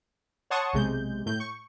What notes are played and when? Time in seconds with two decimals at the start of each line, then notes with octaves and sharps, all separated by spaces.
0.50 C#5 F#5 A5 C6 C#6 D#6
0.73 B1 C3 G#3 G6
1.26 A2 G6
1.40 C#6